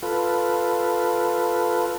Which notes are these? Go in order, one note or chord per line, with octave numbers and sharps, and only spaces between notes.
F4 A4 B4